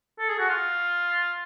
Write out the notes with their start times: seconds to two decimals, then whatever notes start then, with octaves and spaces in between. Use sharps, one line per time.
0.19 A4
0.29 G#4
0.39 F#4
0.49 F4